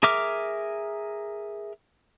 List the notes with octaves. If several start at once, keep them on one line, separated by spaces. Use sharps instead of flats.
G#4 A#4 E5 D6 F6